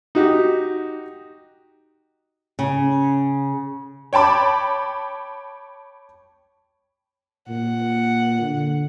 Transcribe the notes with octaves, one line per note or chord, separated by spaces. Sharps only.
D#4 F#4 G4
C#3
C#5 G5 A5 B5 D6
A#2 F#5
D3